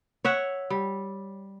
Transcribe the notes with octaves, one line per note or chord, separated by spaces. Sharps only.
C#5 E5 F#5
G3